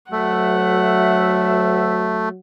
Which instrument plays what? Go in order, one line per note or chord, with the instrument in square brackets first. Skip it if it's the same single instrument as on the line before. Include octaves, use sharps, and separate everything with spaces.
[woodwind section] D2 E5 [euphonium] F#3 [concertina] A3 [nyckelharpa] F#5